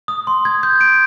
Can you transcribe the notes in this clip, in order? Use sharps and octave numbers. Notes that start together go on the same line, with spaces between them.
D#6
C6
G#6
G6
D7